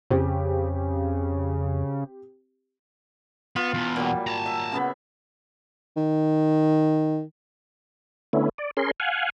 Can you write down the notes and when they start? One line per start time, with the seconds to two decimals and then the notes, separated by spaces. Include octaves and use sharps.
0.10 F2 C#3 C4 G4
3.56 B3 F4
3.74 E2 B2
3.96 A#2 F#3 G3
4.27 A5 A#5
4.46 E5
4.72 C#3 B3 E5
5.96 D#3
8.33 D3 A3 B3 C#4 E4
8.58 D5
8.77 C#4 G#4 A#4 C6
9.00 F5 F#5 G#5